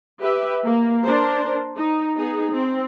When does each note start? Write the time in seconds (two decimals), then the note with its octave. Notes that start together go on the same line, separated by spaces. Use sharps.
0.22 G4 B4 E5
0.63 A#3
1.04 D4 A#4 C5
1.76 D#4
2.17 B3 D#4 G#4
2.51 C4